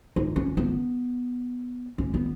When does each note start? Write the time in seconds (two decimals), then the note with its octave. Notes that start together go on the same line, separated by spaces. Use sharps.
0.16 D#4
0.36 C#4
0.57 B3
1.98 C#4
2.14 B3